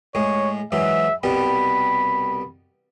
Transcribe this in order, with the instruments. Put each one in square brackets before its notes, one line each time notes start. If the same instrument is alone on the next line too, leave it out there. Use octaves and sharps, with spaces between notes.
[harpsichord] A2 G#3 [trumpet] C#5
[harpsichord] G#2 E3 F#3 [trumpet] E5
[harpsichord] C2 B2 G3 [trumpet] B5